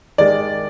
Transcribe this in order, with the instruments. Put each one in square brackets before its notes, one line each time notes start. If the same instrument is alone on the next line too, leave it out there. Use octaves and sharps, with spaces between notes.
[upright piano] D#3 G#3 D5